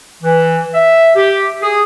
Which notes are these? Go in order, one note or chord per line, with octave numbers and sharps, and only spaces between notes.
E3
E5
G4
G#4